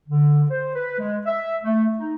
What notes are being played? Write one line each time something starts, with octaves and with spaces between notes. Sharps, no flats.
D3
C5
B4
G#3
E5
A3
D#4